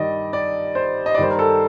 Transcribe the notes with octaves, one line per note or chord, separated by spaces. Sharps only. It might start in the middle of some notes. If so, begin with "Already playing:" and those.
Already playing: G2 D#3 D5 D#5
D5
C5
D#5
D5
G2 D#3 C5
A#4
A4